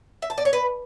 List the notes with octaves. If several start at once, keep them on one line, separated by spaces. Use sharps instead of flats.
E5
A5
D5
C#5
B4